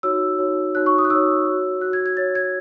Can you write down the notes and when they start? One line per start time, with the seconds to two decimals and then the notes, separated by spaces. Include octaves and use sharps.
0.03 D#4 F#4 C#5 E6
0.39 D#4 F#4 C#5
0.75 D#4 F#4 C#5 F#6
0.86 C#6
0.98 D#6
1.05 F#6
1.10 D#4 F#4 C#5 E6
1.46 F#4 C#5
1.81 F#4 C#5 F#6
1.93 G#6
2.06 G#6
2.17 F#4 C#5 A6
2.35 G#6